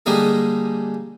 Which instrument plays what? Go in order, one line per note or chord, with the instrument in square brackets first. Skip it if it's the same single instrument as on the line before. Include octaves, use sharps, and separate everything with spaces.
[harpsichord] D3 G3 G#3 A#3 D#4 G#4